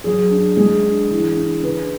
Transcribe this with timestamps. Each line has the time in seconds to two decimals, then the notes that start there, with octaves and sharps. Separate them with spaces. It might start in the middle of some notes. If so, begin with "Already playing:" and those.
0.04 F#3 G#4
0.31 D4
0.57 G#3 G#4
0.83 D4
1.10 E3
1.36 D4
1.63 C#3 B4